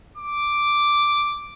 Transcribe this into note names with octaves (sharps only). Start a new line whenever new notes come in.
D6